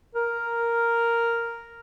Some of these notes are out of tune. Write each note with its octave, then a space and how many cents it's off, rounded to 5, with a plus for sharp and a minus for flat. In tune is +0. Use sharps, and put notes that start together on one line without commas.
A#4 +0